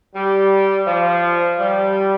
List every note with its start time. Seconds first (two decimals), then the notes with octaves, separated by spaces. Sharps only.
0.15 G3
0.87 F3
1.60 G3